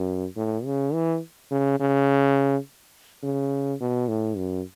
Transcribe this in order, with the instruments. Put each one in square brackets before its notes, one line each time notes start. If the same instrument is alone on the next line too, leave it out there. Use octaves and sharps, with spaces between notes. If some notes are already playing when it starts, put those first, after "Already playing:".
Already playing: [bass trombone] F#2
A2
C#3
E3
C#3
C#3
C#3
B2
A2
F#2